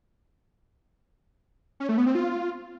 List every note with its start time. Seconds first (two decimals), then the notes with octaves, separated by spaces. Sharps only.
1.80 C#4
1.89 A3
1.98 B3
2.06 C4
2.15 F4